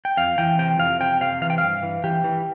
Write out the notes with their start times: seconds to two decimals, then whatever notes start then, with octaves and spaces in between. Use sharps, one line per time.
0.05 G5
0.17 F2 F5
0.38 E3 G5
0.59 C3 G5
0.79 F2 F5
1.00 C3 G5
1.21 C3 F5
1.41 E3 F5
1.50 G5
1.58 G2 F5
1.83 E3
2.04 E3 G4
2.24 E3